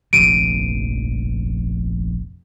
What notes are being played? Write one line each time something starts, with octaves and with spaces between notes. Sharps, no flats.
F1 A#1 D#2 D7 D#7